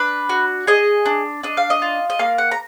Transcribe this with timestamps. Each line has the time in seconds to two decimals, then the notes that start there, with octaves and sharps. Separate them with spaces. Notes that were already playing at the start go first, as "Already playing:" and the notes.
Already playing: D4 B4
0.29 F#4
0.67 G#4 D#5
1.06 D4
1.43 D4 D#5
1.57 F5
1.70 D#5
1.82 F4
2.10 D#5
2.19 A#3 F5
2.38 F#5
2.51 A#5